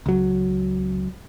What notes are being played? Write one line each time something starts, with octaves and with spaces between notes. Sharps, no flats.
C#2 F#3